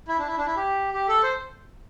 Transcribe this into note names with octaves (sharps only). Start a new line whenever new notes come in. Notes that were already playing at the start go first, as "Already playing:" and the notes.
E4
D4
E4
D4
E4
G4
G4
A4
C5